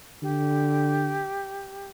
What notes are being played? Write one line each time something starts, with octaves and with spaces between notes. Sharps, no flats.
D3 G4